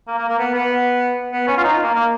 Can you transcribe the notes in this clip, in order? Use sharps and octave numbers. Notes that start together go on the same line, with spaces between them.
A#3
A#3
A#3
B3
B3
B3
C#4
F4
D#4
F4
A#3
A#3